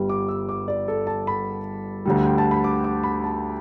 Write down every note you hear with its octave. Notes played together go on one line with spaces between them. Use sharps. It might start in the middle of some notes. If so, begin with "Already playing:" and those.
Already playing: G1 G2 G3
D6
E6
D6
D5
A4
A5
B5
D2 D3 G3
G5
A5
B5
D6
D6
B5
A5